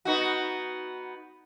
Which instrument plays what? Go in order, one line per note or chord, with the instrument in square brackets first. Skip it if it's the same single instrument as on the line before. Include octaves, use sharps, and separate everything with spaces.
[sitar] B3 D#4 F#4